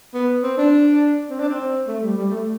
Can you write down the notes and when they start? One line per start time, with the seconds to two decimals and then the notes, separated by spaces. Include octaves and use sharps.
0.14 B3
0.43 C4
0.57 D4
1.30 C4
1.40 D4
1.49 C4
1.87 A3
2.02 G3
2.17 G3
2.30 A3